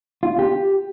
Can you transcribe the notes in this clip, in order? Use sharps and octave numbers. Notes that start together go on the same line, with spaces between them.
F4
G4